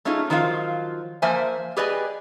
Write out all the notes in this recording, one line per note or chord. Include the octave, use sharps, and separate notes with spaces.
A3 C#4 D#4 F4 G#4
D#3 F3 F#3 F4 F5
F3 A#3 C5 E5 G#5
G4 G#4 B4 D5 D#5 G#5